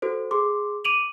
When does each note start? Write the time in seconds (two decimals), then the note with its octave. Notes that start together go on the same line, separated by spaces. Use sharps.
0.02 F#4 A4 C5
0.31 G#4 C6 D6
0.85 D6 D7 D#7 F7 F#7